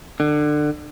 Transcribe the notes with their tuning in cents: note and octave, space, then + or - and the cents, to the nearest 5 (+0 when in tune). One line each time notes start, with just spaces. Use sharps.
D3 +25